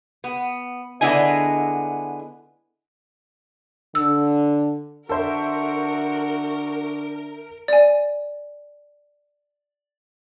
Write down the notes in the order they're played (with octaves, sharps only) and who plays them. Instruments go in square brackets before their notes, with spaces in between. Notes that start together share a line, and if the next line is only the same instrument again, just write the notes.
[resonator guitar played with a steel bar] B3
D3 G#3 B3 E4 D#5 G#5
[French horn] D3 [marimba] E6
[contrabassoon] D3 [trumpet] F#4 [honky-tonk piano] A4 C5 E5 [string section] A#4
[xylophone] D5 G#5